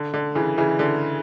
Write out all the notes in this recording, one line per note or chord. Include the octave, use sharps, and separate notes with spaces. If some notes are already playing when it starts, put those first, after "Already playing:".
Already playing: D3
D3
C#3 E3
C#3 E3
D3